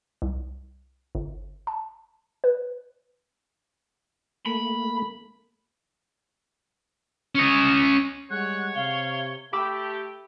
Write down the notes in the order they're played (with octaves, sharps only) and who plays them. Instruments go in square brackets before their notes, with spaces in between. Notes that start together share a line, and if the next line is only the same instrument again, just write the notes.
[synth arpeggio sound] C2
G1
A5
B4
[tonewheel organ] A3 A#3 [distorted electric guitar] B5
[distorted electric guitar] C#4 D#5
[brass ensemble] G3 G#3 F#5 [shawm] C#5 [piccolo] F#6
[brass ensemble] C3 [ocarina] F5 [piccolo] G7
[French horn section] A3 G4 [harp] B5 D6 E6